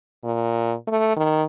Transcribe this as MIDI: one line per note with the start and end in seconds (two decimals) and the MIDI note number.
0.24 0.74 46
0.87 1.14 57
1.17 1.43 51